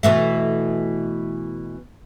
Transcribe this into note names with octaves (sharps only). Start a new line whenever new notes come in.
B2 E3 A3